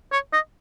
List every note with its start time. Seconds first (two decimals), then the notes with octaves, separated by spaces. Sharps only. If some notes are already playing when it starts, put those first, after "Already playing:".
0.12 C#5
0.33 D#5